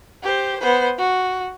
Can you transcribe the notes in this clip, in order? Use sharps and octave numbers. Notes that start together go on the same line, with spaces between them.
G4 C5
B3 C5
F#4